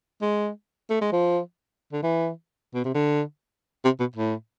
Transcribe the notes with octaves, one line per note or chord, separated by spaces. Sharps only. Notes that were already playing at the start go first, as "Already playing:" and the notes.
G#3
A3
G#3
F3
D3
E3
B2
C3
D3
C3
B2
A2